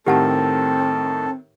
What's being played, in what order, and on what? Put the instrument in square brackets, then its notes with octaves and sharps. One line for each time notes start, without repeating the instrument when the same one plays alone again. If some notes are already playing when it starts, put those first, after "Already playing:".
[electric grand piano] A2 D#3 A#4 [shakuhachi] C4 [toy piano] G4 F#5 A5 [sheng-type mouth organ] A4